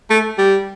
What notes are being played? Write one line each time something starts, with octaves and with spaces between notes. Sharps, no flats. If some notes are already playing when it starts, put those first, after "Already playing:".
A3
G3